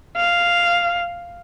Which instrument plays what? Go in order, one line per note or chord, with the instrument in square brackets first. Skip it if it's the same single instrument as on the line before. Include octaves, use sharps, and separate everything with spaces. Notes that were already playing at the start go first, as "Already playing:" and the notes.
[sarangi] F5